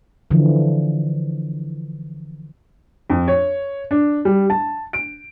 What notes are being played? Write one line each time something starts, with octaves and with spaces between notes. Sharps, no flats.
D3 E3 F3
F2
C#5
D4
G3
A5
D7